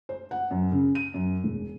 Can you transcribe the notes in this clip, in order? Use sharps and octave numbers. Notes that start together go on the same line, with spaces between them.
C5
F#5
F#2
C#3
D#7
F#2
E1